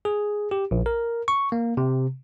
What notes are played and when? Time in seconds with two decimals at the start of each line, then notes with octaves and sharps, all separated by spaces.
0.05 G#4
0.51 G4
0.71 A#1
0.86 A#4
1.28 C#6
1.52 A#3
1.77 C3